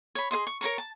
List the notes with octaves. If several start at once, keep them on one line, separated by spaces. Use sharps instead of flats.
C#5 B5
G#4 C5 D#5 C6
C#6
A#4 C#5 A#5 C#6
A5